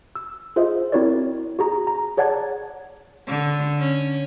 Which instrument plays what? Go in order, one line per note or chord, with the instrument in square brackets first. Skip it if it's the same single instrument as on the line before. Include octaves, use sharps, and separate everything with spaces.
[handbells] E6
F4 G#4 C5 D#5 E5
C4 E4 F#4 A#4 C#5 D5
F#4 G#4 A#5
A#5
G#4 C#5 D5 F#5 A5 G#6
[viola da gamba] D3
C#4